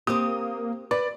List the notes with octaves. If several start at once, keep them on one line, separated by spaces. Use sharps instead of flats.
A#3 C4 G4 D#6
B4 D5